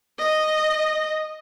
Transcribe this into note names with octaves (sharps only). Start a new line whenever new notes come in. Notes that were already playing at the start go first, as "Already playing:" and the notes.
D#5